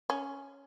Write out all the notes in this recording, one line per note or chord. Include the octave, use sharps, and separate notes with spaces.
C#4